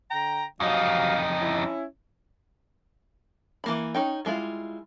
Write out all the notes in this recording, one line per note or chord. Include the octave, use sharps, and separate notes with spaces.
D3 G5 A#5
F2 C3 F#3 D#4 F5
C#4 E4
E3 A#3 B5
C#4 D#4 G5
G3 G#3 E4 F4